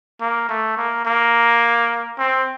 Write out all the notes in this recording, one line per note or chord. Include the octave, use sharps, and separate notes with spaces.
A#3
A3
A#3
A#3
C4